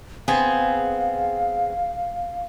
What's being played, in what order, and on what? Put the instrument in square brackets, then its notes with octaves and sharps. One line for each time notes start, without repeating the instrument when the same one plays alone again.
[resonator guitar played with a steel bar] B3 C4 [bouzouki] G#4 [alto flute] F5